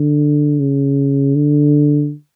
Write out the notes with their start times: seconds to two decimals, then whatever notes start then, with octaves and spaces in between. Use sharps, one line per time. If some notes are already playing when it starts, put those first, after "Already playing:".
Already playing: D3
0.60 C#3
1.35 D3